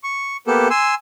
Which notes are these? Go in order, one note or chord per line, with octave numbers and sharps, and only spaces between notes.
C#6
A#3 B3 G4 A4
G#5 C6 E6